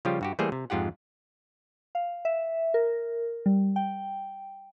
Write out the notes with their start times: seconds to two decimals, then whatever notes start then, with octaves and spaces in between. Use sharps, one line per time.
0.05 C#3 F3 G3 F4 G4
0.21 G2 F#4 G4
0.39 E3 G3 A3 A#3 G#4 C5
0.52 C3
0.70 F2 G#2 F4 G4 F#5
1.95 F5
2.25 E5
2.74 A#4
3.46 G3
3.76 G5